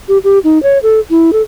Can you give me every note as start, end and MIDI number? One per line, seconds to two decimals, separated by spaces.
0.09 0.18 67
0.24 0.39 67
0.44 0.61 63
0.63 0.78 73
0.83 1.00 69
1.10 1.31 64
1.33 1.42 69